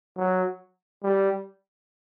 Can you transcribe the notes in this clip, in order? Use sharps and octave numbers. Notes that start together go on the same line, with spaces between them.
F#3
G3